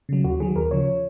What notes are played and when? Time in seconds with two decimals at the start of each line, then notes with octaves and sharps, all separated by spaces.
0.09 C#3 F#3
0.24 D#2 F#4
0.40 D#3 F#3 G#4
0.56 D#2 A#4
0.71 C#3 F3 C#5